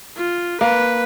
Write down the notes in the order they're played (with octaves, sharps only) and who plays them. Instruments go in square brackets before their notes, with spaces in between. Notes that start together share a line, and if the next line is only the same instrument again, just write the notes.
[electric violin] F4
[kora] A#3 [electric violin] B4